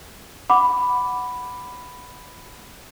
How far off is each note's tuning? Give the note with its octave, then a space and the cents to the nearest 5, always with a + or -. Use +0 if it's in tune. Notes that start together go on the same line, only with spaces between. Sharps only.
F#5 +0 B5 +5 D6 +0